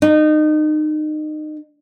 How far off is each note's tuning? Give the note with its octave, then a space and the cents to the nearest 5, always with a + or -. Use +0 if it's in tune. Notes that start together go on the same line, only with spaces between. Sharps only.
D#4 -25